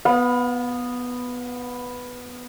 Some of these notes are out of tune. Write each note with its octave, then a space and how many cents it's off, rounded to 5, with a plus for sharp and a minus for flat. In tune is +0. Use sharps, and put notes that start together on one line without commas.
B3 +0 F5 +40